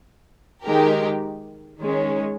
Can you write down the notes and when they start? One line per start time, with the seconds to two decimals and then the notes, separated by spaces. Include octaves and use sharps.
0.65 D#3 G#3 D#4 G4 A#4
1.79 D#3 G#3 C#4